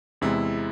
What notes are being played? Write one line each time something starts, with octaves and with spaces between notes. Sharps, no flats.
E2 C3 G#3 E4